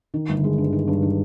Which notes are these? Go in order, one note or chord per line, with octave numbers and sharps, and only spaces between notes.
D#3
G1
G#3
G2
D#3
G2
D#3